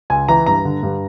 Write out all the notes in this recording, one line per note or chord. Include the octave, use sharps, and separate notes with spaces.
C#2 G#5
E3 A#5
G2 A#5
D3
G2